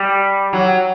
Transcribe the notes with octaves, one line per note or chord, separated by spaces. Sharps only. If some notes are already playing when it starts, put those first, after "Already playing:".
Already playing: G3
F#3